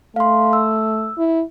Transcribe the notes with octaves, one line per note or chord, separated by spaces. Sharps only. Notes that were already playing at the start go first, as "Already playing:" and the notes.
A3 F5 C6
E6
E4